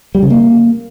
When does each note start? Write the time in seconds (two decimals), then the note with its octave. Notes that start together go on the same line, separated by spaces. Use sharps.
0.15 G3
0.22 C#3
0.30 A#3